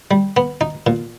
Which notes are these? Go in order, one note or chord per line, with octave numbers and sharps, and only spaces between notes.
G3
B3
D#4
A#2